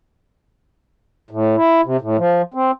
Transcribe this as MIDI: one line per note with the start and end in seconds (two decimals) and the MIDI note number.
1.31 1.56 45
1.57 1.81 64
1.85 1.97 48
2.01 2.17 45
2.18 2.42 53
2.54 2.71 60